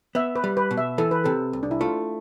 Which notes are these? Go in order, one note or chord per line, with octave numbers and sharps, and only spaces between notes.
B3 E5
B4
G3
B4
B2
E5
E3 A4
B4
C3 A4
C2
D4
E4
A3 F4